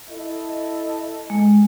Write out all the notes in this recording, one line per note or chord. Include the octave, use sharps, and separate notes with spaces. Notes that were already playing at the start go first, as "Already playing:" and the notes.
E4 A4 D#5
G#3